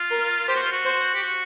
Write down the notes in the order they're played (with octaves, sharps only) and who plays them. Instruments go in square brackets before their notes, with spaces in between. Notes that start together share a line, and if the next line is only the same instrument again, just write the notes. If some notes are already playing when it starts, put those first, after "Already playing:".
Already playing: [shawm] F4
[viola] A#4
[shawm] G4 [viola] C5
[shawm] F#4
F4
F#4
[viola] C5
[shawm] G4
F#4